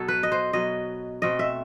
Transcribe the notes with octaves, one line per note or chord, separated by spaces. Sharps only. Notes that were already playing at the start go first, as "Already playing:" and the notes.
Already playing: B2 F#3 B3 A4
B4
D#5
C5
B2 F#3 B3 D#5
B2 A3 C4 D#5
E5